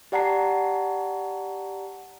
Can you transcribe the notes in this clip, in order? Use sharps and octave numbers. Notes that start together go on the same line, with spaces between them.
G4 D5 F#5 A5 A#5 C7